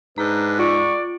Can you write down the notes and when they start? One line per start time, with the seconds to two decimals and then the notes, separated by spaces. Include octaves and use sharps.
0.18 G#2 D4 B4 A#5
0.59 F4 D5 C#6